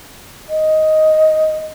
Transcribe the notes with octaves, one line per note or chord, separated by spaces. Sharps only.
D#5